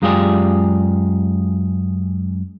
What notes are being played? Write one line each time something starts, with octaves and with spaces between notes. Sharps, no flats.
F#2 G#3 F4 G4 G#4 D5